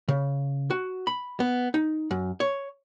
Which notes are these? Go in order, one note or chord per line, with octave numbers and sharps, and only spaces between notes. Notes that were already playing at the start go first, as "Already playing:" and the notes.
C#3
F#4
B5
B3
D#4
F#2
C#5